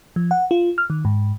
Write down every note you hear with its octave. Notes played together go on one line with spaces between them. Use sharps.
F3
F#5
F4
F6
D#3
G#2